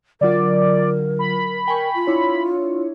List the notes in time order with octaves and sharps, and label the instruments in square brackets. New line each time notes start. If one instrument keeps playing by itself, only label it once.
[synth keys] D3 F#3 F4 [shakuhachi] A#4 [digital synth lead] D5
[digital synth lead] B5
[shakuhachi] A#4 [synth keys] G5 G#5 C#6
[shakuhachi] F4
[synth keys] D4 E4 C#5